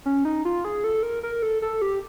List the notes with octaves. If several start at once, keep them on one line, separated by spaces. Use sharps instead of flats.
C#4
D#4
F4
G#4
A4
A#4
A#4
A4
A4
G4